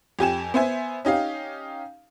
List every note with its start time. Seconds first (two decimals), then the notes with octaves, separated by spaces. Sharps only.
0.19 F2 G4 G#5 E7
0.54 B3 C5 E5 G#5
1.05 C#4 D#4 G4 F5